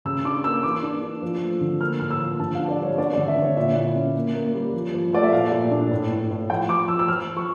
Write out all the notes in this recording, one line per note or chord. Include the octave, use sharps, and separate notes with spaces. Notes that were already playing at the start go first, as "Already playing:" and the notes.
C#3 E6
D4 D6
A#3 E6
E3 D6
D4
D4
F3
A3
D3
A#3 F6
A2 F6
E6
F3
D3 A5
F5
D4
D5
G3 C#5
D4 D5
D5
D3
E5
D3
C#5
A#2 E5
E4
C#4
A#3
A#3
G3
F3
F3
A3 D5
E5
A#2 F5
A#2
D4
A2
A2
A2
F3 G5
F3 D6
F3 E6
E6
F3 F6
F3
C#6